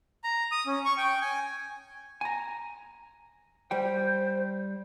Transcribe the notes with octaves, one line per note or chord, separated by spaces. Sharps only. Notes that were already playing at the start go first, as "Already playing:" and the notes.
A#5
D#6
C#4
C#6
G5
G#5
G#5 A#5
G3 C5 G5